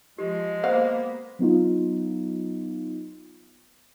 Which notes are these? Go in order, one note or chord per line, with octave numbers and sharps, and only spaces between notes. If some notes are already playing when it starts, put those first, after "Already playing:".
F3 G#3 G4
A#3 B3 C5 F5
F#3 B3 D#4 F4